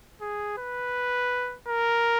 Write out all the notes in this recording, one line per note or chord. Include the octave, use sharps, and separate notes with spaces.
G#4
B4
A#4